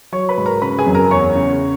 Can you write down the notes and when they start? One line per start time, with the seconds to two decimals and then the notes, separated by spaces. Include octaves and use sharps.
0.12 F#3 C#5 C#6
0.29 B4 B5
0.38 G#2
0.46 A#4 A#5
0.62 C#3 B4 B5
0.79 G#4 G#5
0.87 F#2
0.95 A#4 A#5
1.11 E2 C#5 C#6
1.35 C#3